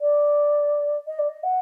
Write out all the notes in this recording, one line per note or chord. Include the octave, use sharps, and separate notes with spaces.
D5
D#5
D5
D#5
F#5